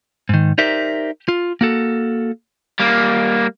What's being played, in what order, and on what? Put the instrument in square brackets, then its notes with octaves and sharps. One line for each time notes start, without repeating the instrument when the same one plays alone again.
[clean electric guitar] G#2 D#3
D#4 G4 A#4 C5 D5 E5
F4
A#3 F#4 A4
[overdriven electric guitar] G3 A#3